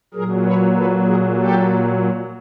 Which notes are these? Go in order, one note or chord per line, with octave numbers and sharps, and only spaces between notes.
A#2 F#3 G#4 A#4
B4 C#5
A4 B4
G#4 A#4
G4 A4